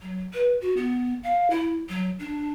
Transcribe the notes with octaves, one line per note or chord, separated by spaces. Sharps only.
F#3
B4
F#4
B3
F5
E4
F#3
D4